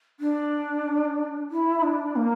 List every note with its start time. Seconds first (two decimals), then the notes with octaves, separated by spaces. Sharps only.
0.20 D4
1.50 E4
1.83 D4
2.15 A#3